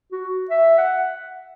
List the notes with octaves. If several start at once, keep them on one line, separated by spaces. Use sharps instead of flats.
F#4
E5
F#5